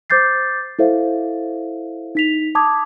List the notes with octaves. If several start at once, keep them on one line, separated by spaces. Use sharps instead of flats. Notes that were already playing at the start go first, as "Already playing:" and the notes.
C5 D6 G6 A6 C7
E4 A4 C5 E5 F5
D#4 B6 F7
A5 D6 D#6 G#6